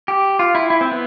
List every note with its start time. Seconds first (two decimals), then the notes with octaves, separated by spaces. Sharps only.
0.08 G4
0.39 F4
0.55 E4
0.70 E4
0.81 C4
0.91 B3